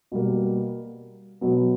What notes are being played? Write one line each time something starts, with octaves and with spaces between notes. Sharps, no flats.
B2 G3 A#3
B2 F#3 B3